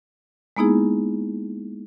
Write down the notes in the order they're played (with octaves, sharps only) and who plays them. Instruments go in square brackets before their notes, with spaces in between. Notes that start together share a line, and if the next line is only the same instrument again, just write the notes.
[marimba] G#3 A#3 B3 D#4 E4 G#4